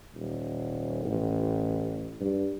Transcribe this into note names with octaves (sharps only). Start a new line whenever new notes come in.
D#1
A1
G2